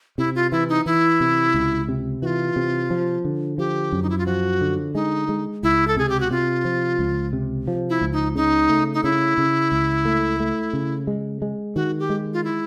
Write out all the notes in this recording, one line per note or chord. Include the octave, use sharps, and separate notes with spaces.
C3 E4
F4
E3 E4
D#4
E3 E4
C3
C#2
C3
E3 F4 F#4
C3
F3
D3
F3 G4
F#2
D#4
E4
F4
F3 F#4
D3
G#3 D#4
G#3
C#2 E4
A4
C3 G#4
G4
F#4
C3 F4
F3
C#2
C3
F3
E4
C#2
D#4
C#3 D#4
A3
D#4
C#3 E4
C#3
C#2
A3
A3
C#3
G#3
G#3
D#3 F#4
G4
G#3
F4
E4